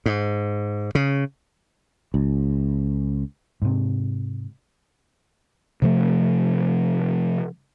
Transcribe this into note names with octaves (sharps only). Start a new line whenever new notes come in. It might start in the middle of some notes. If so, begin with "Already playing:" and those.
G#2
C#3
C#2
G#2 C3
C3 F3 A3